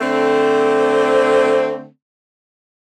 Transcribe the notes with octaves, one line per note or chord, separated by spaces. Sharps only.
D3 A3 C4